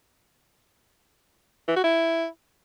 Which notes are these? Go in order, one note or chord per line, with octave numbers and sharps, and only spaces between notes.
E3
F#4
E4